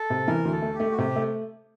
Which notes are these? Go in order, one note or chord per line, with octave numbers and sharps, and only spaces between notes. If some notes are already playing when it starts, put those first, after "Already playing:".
Already playing: A4
C3
E3 A#4
D2
A4
A3
G4
A3
F#4
C3 G4
A3